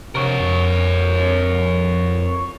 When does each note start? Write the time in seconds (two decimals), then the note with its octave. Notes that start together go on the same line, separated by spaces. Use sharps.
0.15 C3 A#4 C#5
0.40 F2